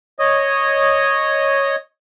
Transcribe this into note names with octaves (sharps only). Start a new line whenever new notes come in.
C#5 D#5 D#6